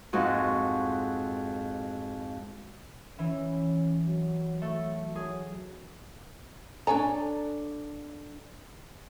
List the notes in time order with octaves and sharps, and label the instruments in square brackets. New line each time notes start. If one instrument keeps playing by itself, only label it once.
[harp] F2 G#2 G#3 F#4
[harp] E3 [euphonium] C#4
[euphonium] F#3
[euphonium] F#3 [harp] A3
[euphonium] F#3 [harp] G#4
[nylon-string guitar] D4 A4 [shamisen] C#5 G#5 A#5